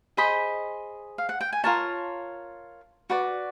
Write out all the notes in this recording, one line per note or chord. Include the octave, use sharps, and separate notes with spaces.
G#4 C5 D#5 B5
F5
F#5
G5
G#5
F4 A#4 C#5 A5
F#4 B4 D5